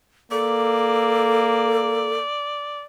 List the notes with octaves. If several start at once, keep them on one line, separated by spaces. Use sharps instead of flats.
A#3 A4 D5